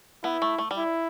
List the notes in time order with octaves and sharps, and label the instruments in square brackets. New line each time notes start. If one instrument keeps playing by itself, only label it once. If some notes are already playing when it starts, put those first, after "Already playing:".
[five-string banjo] B3 [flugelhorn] E4
[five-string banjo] A3
A3
G3
[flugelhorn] E4